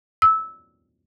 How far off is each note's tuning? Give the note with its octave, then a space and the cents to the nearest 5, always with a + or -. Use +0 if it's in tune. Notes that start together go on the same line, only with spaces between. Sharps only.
E6 -15